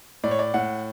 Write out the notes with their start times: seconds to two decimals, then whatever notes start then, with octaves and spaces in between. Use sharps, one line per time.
0.24 A2 D5
0.31 C#5
0.39 D5
0.54 A2 F#5